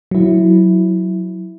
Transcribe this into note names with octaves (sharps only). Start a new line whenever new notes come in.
F#3 E4